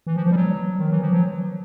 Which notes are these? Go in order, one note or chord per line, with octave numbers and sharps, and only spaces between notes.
E3
F3
F3
G3
F#3
D#3
E3
F3
F#3